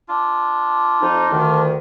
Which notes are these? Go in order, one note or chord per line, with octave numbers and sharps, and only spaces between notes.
D4 F4
F2 D#4
D2 D#3